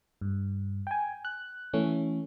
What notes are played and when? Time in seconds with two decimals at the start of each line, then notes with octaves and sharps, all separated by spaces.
0.21 G2
0.87 G5 G#5
1.25 F#6
1.73 E3 A3 C#4